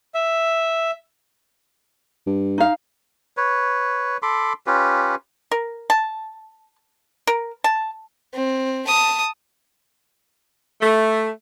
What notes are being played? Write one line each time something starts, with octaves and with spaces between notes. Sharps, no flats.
E5
G2
D#4 F5
B4 C#5
A4 B5 C6 D6
C#4 F4 G4 B4
A#4
A5
A#4
A5
C4
A5 D#6
A3